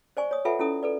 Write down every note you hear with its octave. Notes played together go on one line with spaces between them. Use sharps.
C5 D5 G#5 C#6
C#5 D#6
F4 A4 B4 E5 F#5 G#5
C#4 E4 A4 D#6
A4 B4 D5